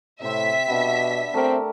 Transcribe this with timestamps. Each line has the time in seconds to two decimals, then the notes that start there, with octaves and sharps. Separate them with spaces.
0.22 A2 C3 C4 E5 B6
0.68 B2 B3 D4
1.34 A3 C4 G4 A#4